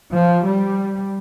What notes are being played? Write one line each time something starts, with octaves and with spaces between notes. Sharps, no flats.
F3
G3